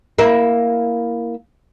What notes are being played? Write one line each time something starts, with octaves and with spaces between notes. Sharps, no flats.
A#3 E4